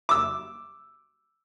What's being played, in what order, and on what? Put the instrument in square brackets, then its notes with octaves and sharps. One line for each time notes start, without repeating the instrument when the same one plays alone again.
[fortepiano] D6 E6